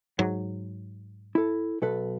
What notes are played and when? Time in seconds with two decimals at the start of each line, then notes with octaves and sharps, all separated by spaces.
0.19 G#2 F#3
1.35 E4 A4
1.82 B1 A4 B4